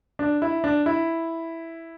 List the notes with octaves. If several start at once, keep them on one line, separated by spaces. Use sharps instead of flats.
D4
E4
D4
E4